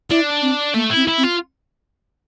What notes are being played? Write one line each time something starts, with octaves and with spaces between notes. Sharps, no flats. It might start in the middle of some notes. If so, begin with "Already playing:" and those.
D4 E4
C4
A3 A#3
E4
C4
E4
C4
F4